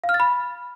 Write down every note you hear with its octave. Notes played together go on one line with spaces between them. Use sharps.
F5
F6
A6
B5